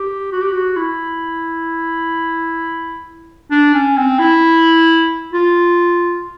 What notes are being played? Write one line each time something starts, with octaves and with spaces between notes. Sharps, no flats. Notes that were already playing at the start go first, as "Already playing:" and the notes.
Already playing: G4
F#4
G4
F#4
E4
D4
C#4
C4
E4
F4